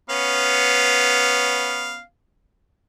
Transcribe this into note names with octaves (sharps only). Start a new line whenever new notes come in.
B3 C#4 F5